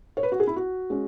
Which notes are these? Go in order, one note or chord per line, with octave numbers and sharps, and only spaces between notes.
C#5
B4
F#4
G#4
E4
F#4
G#3 C#4